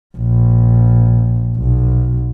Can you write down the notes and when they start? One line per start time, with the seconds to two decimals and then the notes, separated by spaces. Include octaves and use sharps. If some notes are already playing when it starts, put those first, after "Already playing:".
0.17 A#1
1.58 B1